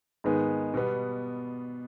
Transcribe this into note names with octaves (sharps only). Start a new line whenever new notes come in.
G#2 D#3 G#3 B3
B2 G3 B3